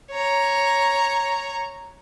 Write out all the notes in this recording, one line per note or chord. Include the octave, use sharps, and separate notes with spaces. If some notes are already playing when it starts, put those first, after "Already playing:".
C#5 A#5